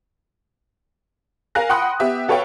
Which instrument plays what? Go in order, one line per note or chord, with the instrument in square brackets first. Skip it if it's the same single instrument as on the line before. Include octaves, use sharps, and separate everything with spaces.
[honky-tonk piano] A#4 F5 G#5 F#6 A#6
F#5 G5 B5 C6 D#6 F#6
B3 G4 E5
F#4 A4 B4 C#5 F5 G5